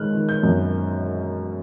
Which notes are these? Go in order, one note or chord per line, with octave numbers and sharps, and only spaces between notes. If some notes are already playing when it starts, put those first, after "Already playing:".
Already playing: D#3 G#3 F6 F#6
D#3
G6
F#2